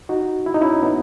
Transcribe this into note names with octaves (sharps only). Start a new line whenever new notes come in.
D#4 F#4
E4
D#4
C#4 E4
B3 D#4